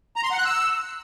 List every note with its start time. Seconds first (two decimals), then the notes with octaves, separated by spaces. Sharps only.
0.16 A#5
0.24 C6
0.31 F#5
0.38 F#6
0.45 E6